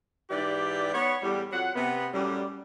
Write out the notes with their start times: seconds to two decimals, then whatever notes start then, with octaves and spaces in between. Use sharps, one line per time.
0.30 G#2 E3 G4 D5
0.94 B3 C#5
1.23 E2 A2 G3
1.52 F2 F#3 F#5
1.75 C3 B3
2.13 F#2 A2 G3